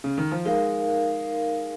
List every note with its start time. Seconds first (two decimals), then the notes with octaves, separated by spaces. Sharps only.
0.04 C#3
0.18 D#3
0.32 F3
0.45 G#3 D#4 A#4 F5